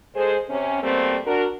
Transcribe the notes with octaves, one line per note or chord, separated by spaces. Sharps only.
G#3 G#4 A4 C5
C3 C#4
B2 G3 A3 A#3 C4
D4 F#4 A#4